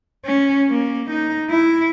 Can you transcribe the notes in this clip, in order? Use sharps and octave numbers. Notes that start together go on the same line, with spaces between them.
C#4
A#3
D#4
E4